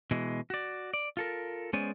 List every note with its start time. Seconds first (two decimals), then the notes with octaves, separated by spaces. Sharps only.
0.11 B2 E3 G#3
0.50 F#4 D5
0.94 D5
1.17 F4 A4 A#4
1.73 G#3 B3 C#4 C5 D5 G#5